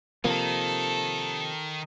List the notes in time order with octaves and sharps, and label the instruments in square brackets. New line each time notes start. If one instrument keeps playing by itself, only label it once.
[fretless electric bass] C3 F3 A#3 [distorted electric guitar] D#3 [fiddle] A4